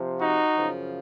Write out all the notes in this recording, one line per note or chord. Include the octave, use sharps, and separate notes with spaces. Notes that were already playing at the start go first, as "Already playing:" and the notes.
Already playing: C3 F3
D#4 F#4
F#2 C#3 F3